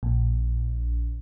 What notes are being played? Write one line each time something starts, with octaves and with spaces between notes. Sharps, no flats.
A#1